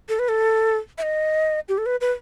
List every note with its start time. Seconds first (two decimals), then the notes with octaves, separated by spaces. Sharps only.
0.09 A4
0.19 B4
0.28 A4
0.98 E5
1.02 D#5
1.69 G4
1.78 A4
1.86 B4
2.01 B4